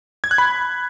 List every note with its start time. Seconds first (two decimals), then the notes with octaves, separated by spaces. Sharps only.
0.24 G#6
0.31 F#6
0.38 B5